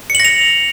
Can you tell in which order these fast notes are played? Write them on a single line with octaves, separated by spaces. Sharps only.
C#7 F#7 A#6 F7